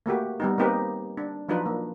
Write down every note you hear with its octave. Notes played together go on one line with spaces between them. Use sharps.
A3 A#3 F#4 G4
G3 B3 D#4
A#3 C4 D#4 G4 B4
D4
F3 F#3 D4 D#4 F4 B4
A#3